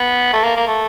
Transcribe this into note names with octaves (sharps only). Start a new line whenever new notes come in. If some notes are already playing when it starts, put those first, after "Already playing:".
Already playing: B3
A3
A#3
A#3
A3